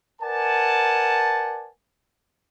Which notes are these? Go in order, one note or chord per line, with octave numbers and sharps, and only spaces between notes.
A#4 B4 D5 F#5 G#5 A5